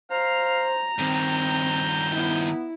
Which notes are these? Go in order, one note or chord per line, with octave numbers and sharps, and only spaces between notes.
C5 F5 A#5
G2 D#3 C4 G6
B3 E4